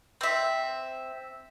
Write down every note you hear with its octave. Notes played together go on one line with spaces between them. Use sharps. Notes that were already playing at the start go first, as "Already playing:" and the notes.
C4 E5